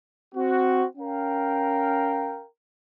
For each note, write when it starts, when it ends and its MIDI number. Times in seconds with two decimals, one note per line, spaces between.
0.35 0.85 60
0.35 0.85 66
0.98 2.44 61
0.98 2.44 70
0.98 2.44 77
0.98 2.44 79